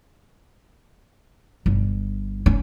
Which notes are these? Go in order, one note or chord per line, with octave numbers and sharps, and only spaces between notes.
G1
C#4